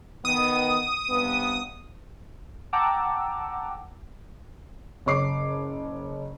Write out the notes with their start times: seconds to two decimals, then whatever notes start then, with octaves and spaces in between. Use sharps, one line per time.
0.25 D#3 B3 D#6
1.09 G2 C3 B3
2.73 F#5 G5 A5 A#5 D6 E6
5.06 F#1 C#5 D6 C7